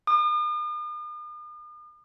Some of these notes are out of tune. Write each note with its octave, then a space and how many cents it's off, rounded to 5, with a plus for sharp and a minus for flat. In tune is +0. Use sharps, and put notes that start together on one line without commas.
D#6 -45